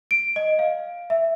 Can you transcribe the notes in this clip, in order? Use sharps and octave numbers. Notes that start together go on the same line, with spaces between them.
D7
D#5
F5
E5